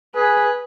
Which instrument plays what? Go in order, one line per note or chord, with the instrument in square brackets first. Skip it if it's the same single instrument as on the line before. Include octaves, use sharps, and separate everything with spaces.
[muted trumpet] G#4 [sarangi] B4